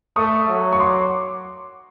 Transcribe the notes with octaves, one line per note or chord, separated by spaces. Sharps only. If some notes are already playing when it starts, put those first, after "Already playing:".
A3 C#6 D#6
F#3
C#6
C6 D6